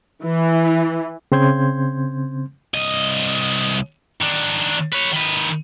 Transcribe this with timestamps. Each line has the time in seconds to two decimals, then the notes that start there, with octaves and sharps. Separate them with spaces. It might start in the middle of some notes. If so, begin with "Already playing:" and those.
0.24 E3
1.32 C#3 C4 C6 G6 G#6
2.74 C2 D#5
4.22 D#3 D4
4.93 B4 C#5
5.13 D#3 B4